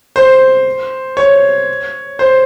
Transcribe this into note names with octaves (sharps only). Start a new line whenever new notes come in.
C5
C#5
C5